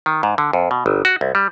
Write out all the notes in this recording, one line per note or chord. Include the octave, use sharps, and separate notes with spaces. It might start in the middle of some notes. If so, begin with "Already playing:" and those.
D#3
G#2
D3
F2
B2
G1
F#4
C2
G3